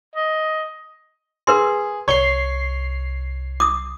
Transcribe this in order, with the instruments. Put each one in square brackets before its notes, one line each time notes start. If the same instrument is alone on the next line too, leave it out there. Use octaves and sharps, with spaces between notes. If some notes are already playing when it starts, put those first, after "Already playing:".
[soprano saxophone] D#5
[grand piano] G#4 [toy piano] A#4 B4 C6
[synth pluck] C2 C7 [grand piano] C#5 G7
[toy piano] D6 D#6